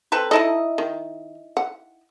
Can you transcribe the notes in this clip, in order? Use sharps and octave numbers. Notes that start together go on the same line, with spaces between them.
C4 A4 B4
D#4 E4 A4 D#5
D#3
F#5